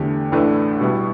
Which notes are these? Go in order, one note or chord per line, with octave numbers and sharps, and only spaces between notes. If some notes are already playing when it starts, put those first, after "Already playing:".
Already playing: E2 D3 A3 G4
A1 A2 A3 D4 B4
B2 G3 B3 E4